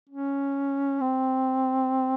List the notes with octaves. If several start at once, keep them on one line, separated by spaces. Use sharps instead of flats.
C#4
C4